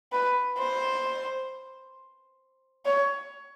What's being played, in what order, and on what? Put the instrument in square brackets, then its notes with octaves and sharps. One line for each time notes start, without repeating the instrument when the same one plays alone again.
[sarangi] B4
C5
C#5